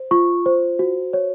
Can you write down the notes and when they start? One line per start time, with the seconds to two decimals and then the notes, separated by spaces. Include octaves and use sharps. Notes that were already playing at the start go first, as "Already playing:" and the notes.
Already playing: C5
0.11 F4 C#6
0.46 C5
0.79 F#4
1.13 C#5